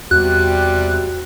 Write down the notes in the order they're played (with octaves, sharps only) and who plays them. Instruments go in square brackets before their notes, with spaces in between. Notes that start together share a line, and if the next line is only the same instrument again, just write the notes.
[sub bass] E2 [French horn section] C3 G3 [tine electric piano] F#4 [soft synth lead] F#6